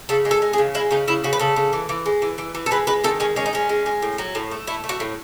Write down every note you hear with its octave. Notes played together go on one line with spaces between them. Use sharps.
C#3 A4
G#3
A4
G#3
G#4
C#3
G#3 E4
C#3 D#4
C#3 E4
C#3 F#4
B4
C#3 A4
C#3
E3
E3
G#3
E3
E3
E3
A4
G#3 B4
G#3 B4
D#3 A4
G#3 C#4
G#3 C#4
D#4
G#3 C#4
G#3
G#3
A2
F#3
A2
A3
A3 E4
A3
F#4
A2